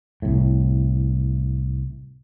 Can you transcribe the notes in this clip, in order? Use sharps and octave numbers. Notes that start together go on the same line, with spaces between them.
C2 A2